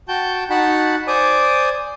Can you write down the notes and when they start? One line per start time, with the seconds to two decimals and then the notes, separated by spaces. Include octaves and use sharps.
0.08 F#4 G5 A5 G6
0.50 D#4 F#4 F#5 A5 B5
1.08 C5 D5 G#5 D6 D#6